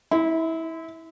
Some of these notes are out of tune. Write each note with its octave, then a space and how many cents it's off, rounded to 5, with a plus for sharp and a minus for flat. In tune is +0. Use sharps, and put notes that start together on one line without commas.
E4 -25 B5 +45